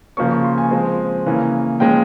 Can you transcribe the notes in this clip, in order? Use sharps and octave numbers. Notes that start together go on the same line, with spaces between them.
C#3 F3 A#3 C#4 C#6
C#6
C6
G#5
F3 G#3 C4
C#3 E3 A#3 C#4
A#2 F3 G#3 C#4 G5